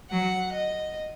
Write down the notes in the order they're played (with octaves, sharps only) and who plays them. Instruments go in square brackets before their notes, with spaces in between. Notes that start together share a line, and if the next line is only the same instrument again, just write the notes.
[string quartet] F#3 [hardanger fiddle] F#5
[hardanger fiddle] D#5